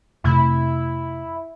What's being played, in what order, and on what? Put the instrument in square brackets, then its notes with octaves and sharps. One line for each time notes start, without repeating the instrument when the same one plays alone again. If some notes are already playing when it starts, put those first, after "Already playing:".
[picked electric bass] F2 C3 A3 [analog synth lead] E4